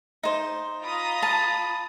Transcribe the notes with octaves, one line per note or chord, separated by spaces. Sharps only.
D#4 C5
F4 A#5 B5 D#6
A5